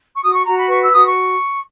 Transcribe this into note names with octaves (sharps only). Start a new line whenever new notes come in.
C#6
F#4 D#6
C#6
F#4 A#5
B5
B4 C#6
E6
F#4 D#6
C#6